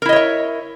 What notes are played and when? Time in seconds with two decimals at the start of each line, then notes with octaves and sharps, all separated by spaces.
0.02 A#4
0.05 E4
0.09 D#5
0.13 C#5
0.16 E5